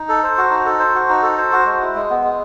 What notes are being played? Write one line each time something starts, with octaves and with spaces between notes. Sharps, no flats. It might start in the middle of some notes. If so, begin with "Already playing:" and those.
Already playing: D#4
A4
C5
F#4
D#4
A4
C5
F#4
D#4
A4
C5
F#4
G#3
E4
G#3
B3
G#3